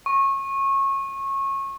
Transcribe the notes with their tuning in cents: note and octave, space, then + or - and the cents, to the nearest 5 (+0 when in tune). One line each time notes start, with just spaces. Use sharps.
C#6 -25